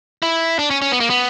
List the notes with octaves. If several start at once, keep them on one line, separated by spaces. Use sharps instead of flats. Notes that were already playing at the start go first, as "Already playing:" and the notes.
E4
D4
C#4
C#4
B3
A#3
B3